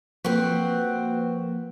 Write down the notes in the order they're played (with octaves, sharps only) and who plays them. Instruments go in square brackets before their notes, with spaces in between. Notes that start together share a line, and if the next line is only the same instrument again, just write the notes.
[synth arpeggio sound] F3 A#3 [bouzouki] C4 F#4 [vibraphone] B4